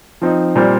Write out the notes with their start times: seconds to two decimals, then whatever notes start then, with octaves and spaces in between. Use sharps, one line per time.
0.22 F3 C4 D#4
0.56 A#2 G3 C4